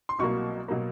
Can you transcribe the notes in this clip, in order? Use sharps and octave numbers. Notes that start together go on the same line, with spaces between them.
C6
C2 B2 F#3 A#3 C#6
B2 F#3 A#3